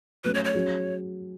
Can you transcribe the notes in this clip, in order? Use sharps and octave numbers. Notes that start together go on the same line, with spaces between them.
F#3 A3 C#4 B4
C#5
C#5
F#3 C#4 G#4